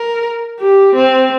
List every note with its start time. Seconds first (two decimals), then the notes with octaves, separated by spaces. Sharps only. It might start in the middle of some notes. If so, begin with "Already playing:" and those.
Already playing: A#4
0.60 G4
0.95 C4